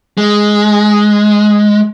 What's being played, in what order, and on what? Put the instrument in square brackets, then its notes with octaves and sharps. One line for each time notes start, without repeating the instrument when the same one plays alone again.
[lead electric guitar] G#3